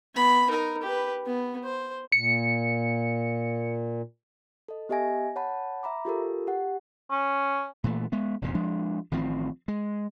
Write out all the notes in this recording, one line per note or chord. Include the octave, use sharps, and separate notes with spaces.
B3 B5
D#4 A#4
G4 B4
B3
C5
A#2 C#7
A4 D#5
B3 G4 D#5 E5 G#5 A#6
C#5 F#5 A5 B5
E5 A#5 B5 D6
F4 G4 A4 A#4
G4 F#5
C#4
A#2 E3 A3
G#3 B3
F1 F2 A#2 C#3
F3 G#3 D4
A1 D#3 F3 C4
G#3